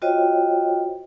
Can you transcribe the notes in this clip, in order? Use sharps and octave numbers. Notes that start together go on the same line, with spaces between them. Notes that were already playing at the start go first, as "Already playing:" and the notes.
F4 F#4 C5 C#5 D#5 G5